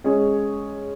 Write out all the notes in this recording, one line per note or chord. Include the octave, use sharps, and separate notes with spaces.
G#3 C#4 G#4 C#5